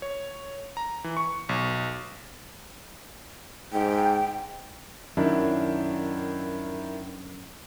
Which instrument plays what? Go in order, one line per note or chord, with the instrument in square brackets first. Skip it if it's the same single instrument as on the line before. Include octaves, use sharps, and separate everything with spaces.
[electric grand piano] C#5
A#5
E3
C#6
B1
[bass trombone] G#2 [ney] G5
[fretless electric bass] F#2 [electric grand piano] D#3 D4 E4